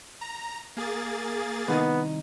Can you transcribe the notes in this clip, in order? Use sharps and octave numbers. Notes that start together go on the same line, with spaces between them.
A#5
A#3 G#4 A6
C2 D#3 B3 D#4